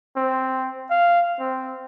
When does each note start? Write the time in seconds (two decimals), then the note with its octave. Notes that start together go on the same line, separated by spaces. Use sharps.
0.17 C4
0.90 F5
1.40 C4